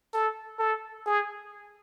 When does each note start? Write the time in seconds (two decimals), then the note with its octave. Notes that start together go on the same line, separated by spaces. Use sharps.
0.14 A4
0.59 A4
1.06 G#4